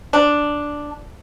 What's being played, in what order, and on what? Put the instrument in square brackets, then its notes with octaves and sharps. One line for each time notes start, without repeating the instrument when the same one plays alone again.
[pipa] D4